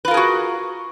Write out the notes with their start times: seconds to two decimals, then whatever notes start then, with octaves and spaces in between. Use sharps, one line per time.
0.05 B4
0.08 F4
0.11 A#4
0.14 G#4
0.17 F#4